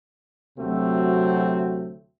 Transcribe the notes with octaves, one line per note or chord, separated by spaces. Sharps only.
D2 C3 F#3 A3 C4 F#4